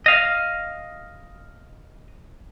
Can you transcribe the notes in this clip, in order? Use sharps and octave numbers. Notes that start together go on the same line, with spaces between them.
D#5 F5